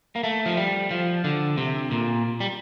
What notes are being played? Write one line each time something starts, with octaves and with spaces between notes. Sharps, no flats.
A#3
A3
F3
G3
F3
D3
C3
A#2
G3